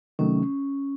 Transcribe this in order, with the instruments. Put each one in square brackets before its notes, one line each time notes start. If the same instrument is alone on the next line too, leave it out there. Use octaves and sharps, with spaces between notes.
[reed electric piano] C3 D#3 F#3 A3 [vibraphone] C#4